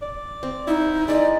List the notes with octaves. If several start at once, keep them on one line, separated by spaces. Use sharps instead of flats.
D5
C4
D#4 E4
G#3 D#4 D5